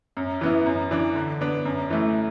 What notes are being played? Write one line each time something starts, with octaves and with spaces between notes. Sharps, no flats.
F#2
E3 B3 E4
F#2
E3 D4
D3
B3 D4
F#2
E3 A3